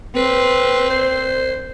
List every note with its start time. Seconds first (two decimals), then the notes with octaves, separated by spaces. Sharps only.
0.16 C4 B4
0.90 C5